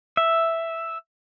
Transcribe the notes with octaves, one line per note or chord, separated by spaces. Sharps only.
E5